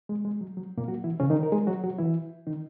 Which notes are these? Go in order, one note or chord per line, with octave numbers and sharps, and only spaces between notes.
G#3
G#3
F#3
F#3
A#2 A#3
F#3 F#4
E3 E4
C#3 C#4
D#3 D#4
A#4
G#3 G#4
F#3 F#4
F#3 F#4
E3 E4
D#3 D#4